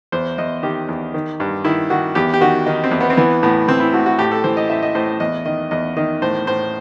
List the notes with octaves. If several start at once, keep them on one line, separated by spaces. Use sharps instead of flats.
E2 C5
E2 D#5
D#3 G4
E2
D#3
G2
D#3 E4
D#3 F#4
E2 G4
G4
D#3 F#4
D#3 D#4
C4
E2
B3
C4
E3 B3
A2 B3
E3 C4
E4
A2 F#4
F#4
A2 G4
A4
E3 C5
D#5
A2 E5
D#5
A2 C5
E2 D#5
D#3 D#5
E2 D#5
D#3 D#5
A2 C5
A2 C5